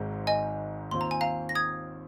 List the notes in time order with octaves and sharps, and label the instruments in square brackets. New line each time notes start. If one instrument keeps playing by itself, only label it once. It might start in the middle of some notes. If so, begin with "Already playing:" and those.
Already playing: [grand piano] G#1 G#2 G#3 C4 D#4
[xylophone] D#5 G#5
[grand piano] D#2 D#3 C4 F4 [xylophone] C6
[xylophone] A#5
G#5
F5 A#5
A#6
D#6 G#6